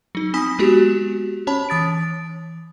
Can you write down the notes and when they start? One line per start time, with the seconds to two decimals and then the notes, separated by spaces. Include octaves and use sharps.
0.15 F#3 D#4
0.34 C4 G#5 B5 D#6 B6
0.59 G#3 B3 F#4 G4
1.47 C#4 C#5 A5 B5
1.69 E3 D#6 A6 D7